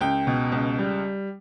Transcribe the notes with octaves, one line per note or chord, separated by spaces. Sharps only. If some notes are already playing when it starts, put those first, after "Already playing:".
C#2 G5
B2
C#2
G3